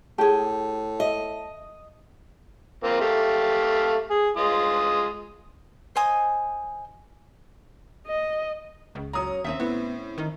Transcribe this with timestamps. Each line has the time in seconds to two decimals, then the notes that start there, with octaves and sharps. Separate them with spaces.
0.18 A2 G4 G#4 A5
1.00 D#5 E5
2.84 A#3 C4 F4
3.01 A3 G4 F5
4.10 G#4
4.37 G#3 F4 D#6
5.96 C5 D#5 G#5 D#6
8.07 D#5
8.95 C#2
9.13 F#2 C#4 A#5 D#6
9.44 D#2 C4 C#4 E5
9.60 A2 B3
10.18 D#3